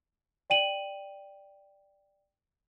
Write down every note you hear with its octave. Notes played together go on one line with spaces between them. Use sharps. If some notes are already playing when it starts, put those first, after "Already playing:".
D5 G5 D#7 F#7